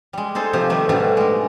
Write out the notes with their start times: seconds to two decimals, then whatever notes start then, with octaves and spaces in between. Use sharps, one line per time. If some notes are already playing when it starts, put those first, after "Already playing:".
0.13 G3 G#3
0.35 D#4 G#4 A4 C5
0.53 C3 F3 G4
0.70 D#3 G3 A3 B4
0.89 G#2 B2 G3 A3 D4
1.17 G#3 A#4